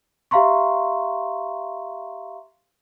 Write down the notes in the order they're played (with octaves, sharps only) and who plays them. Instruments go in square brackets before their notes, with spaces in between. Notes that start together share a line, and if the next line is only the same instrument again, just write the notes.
[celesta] G4 E5 F5 A#5 C6 C#6